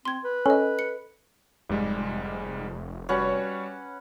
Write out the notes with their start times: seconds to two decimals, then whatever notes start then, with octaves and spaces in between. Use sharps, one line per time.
0.05 C4 C6 G#6
0.24 B4
0.46 C#4 A4 D#5
0.79 C#7
1.70 F1 G#2 G3 G#3
3.09 G3 C#4 F#4 B4 C#5 F#5